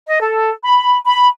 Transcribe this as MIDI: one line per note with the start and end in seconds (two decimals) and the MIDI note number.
0.06 0.18 75
0.22 0.51 69
0.64 0.96 83
1.06 1.28 83